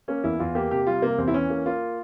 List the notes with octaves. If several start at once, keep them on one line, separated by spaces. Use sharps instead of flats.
A#3 C#4
E2 E4
E2 F4
A#3 G4
C3 G4
G3 F4
C3 A#3
E2 C4
E4
E3 C#4
A#3
A#3 F4